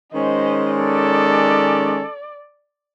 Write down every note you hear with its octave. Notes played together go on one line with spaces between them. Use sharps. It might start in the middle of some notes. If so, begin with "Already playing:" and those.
D#3 G#3 C#4 C5 D#5
A4 D5